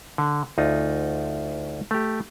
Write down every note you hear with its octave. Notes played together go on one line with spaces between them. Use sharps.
D3
D2 D#4 F4
A3 G4